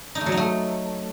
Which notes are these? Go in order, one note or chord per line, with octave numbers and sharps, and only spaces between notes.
D#4
A3
F#3
D#4
A3